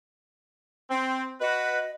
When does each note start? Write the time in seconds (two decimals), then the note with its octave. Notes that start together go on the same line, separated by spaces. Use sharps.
0.90 C4
1.41 F#4 B4 D#5